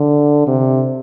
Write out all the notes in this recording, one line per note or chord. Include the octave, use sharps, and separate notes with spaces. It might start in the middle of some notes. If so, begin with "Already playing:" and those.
Already playing: D3
C3